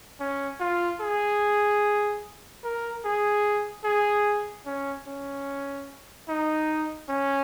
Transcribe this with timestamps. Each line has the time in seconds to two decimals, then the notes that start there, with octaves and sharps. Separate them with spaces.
0.20 C#4
0.60 F4
1.01 G#4
2.64 A#4
3.04 G#4
3.84 G#4
4.66 C#4
5.07 C#4
6.29 D#4
7.09 C#4